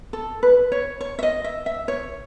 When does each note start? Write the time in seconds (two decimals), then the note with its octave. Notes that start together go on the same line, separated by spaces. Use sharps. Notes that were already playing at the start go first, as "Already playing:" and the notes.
0.13 A4
0.43 B4
0.72 C#5
1.01 C#5
1.19 E5
1.23 D#5
1.44 E5
1.66 E5
1.88 C#5